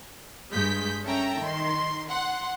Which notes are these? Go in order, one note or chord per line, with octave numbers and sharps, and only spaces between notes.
G2 G#3 G6 B6
C#4 A4 E5 G5 A#5
D#3 C6
F#5 C6